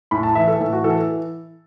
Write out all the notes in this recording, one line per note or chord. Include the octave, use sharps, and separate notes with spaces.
A2 B5
A5
E3 E5
A4
A2
F#4
E3 A4